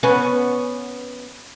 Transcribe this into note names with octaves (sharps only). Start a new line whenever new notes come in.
B3 C#4